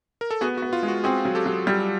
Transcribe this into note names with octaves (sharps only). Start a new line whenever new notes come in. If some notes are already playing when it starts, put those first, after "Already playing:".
A#4
A4
B3 F#4 G#4
F#4
B3
F4
G#3
F#4
C4 F#4 G#4
F#3
G4 A4
F#3
G3